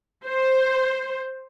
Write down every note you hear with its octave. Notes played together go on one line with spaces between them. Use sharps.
C5